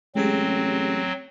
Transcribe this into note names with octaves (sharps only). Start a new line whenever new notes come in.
A1 F#3 G#3 C4 G4 G#4